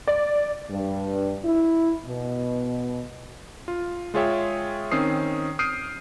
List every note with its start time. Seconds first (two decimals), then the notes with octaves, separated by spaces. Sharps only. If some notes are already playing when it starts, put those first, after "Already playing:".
0.08 D5
0.71 G2
1.45 E4
2.06 B2
3.68 F4
4.14 G#3 F4 G#4 C#5 E5 G5
4.91 D#3 C4 C#4 D#6 C7
5.59 D#6 F6 G6 C7 D7 D#7